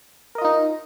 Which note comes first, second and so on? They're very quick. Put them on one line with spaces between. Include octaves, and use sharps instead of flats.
A#4 D#5 F4 D#4